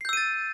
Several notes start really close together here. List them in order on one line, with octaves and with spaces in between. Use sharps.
C7 G6 E6 D#7 A6